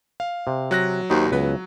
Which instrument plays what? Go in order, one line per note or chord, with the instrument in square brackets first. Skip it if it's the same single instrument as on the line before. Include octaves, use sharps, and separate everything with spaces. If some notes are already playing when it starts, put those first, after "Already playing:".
[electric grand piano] F5
[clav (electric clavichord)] C3
[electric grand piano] F#3 F#6 A#6
[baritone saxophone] D#2 [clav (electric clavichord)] D#4 F#4 C5
[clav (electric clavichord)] C#2 [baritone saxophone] B3